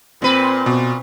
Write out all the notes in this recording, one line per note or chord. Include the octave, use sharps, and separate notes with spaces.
A#2 C4 B4
B2